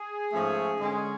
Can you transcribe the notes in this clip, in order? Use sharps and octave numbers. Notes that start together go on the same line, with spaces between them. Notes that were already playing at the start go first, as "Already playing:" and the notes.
Already playing: G#4
G#2 F3 A3 C#4
D3 G#3 C#4